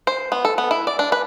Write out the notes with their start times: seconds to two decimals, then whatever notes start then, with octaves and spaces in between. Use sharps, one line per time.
0.07 C5
0.32 B3
0.45 A4
0.58 B3
0.71 E4
0.87 D5
0.99 D4
1.12 B4